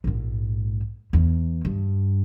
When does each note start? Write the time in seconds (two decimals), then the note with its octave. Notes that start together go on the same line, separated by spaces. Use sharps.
0.04 A#1 G#2
1.13 E2
1.65 G2